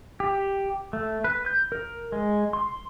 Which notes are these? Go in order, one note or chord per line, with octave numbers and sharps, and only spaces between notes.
G4
A3
B4
G6
A#4
G#3
C6